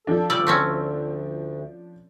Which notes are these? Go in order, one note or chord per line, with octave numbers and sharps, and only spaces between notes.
F3 D4 A4
D2 C#3 G3 D5 E6
A3 C4 C#4